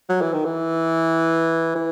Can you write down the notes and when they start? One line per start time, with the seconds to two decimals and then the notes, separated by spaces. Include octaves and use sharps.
0.09 F#3
0.21 E3
0.33 D#3
0.45 E3
1.75 E3